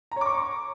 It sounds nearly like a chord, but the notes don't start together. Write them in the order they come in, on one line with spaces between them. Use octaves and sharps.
A#5 C#5 D6 C#6